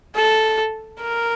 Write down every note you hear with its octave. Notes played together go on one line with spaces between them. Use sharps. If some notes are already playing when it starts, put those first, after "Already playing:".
A4
A#4